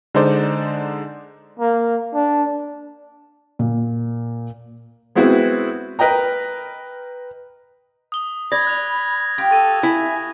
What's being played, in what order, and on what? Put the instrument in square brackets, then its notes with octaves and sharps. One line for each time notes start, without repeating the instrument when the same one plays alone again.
[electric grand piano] D3 G#3 D#4 C5 D5
[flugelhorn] A#3
D4
[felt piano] A#2
[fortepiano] G#3 B3 C4 E4 F#4 B4
A#4 B4 D#5 G5 A#5
[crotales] D#6 G7
[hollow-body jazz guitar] D5 [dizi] B5 [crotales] G#6 A#6
[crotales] F#6 F7
[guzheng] F4 G4
[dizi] A4 [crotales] C#6 A6 D#7
[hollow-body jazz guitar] E4 [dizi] G#5